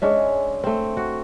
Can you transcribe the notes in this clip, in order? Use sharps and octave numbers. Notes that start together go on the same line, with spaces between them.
G#3 C#4 D4 E5
A3 C4
F#4